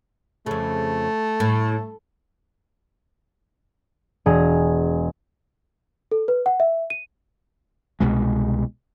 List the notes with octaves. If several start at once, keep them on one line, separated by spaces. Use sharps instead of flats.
F2 C#3 A3
A2
E1 G#4 A#5
A4
B4
F#5
E5
D#7
C2 B2 G#3